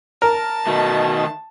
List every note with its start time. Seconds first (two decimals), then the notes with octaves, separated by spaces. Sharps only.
0.22 A#4 A5
0.67 B2 D#3 A3